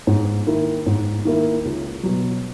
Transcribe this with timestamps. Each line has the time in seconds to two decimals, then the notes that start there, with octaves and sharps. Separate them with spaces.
0.07 G#2
0.46 D#3 A#3 E4
0.86 G#2
1.25 D#3 A#3 E4
1.65 C#2
2.03 B2 F#3